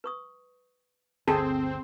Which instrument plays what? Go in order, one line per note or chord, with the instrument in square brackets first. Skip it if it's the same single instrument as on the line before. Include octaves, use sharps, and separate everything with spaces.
[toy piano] B4 C#6 D#6
[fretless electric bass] G1 D2 [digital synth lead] C4 [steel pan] G#4 A4 [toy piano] A5